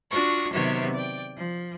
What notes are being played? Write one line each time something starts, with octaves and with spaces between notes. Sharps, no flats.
D4 F4 F#4 C#6 D#6
C3 D#3 F#3 B3 C#5 E5
D5 G5
F3